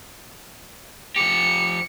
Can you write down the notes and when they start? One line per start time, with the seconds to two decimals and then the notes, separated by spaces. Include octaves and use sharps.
1.16 F3 G4 C#7